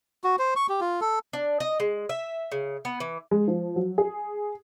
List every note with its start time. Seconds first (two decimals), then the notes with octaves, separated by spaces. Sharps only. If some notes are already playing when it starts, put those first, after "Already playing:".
0.24 F#4
0.39 C5
0.56 C#6
0.69 G4
0.81 F4
1.01 A4
1.33 D4
1.60 D#5
1.80 G#3
2.09 E5
2.52 C#3
2.85 B3
3.00 E3
3.31 G#3
3.48 F3
3.76 F#3
3.98 G#4